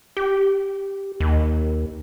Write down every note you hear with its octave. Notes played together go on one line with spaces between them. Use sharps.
G4
D#2